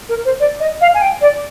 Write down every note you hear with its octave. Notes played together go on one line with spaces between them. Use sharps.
A#4
C5
D5
D#5
F5
G#5
G5
D5